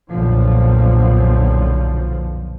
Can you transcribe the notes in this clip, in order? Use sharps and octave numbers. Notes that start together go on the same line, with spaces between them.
B1 F2 A#2 D3 F3